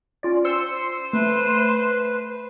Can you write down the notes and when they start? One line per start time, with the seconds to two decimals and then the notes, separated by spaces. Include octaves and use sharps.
0.23 C#4 F4 D5
0.44 C5 C6 E6 C#7
1.13 A3 B4